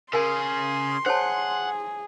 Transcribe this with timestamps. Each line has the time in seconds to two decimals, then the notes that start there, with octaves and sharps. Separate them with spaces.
0.13 C#3 G#4 A#4 G#5 C6
1.06 G#4 C5 C#5 F#5 A5